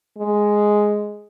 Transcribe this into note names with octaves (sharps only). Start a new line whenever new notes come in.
G#3